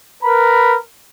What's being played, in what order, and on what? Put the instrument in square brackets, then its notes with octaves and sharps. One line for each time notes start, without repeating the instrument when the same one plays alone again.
[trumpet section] A#4 B4 A#5 B5